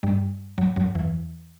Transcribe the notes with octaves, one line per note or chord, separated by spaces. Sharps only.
G2 G3
F#2 F#3
F#2 F#3
E2 E3